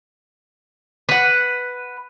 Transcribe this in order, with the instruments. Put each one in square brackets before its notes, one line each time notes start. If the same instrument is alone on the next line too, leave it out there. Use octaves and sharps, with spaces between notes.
[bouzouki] B4 F#5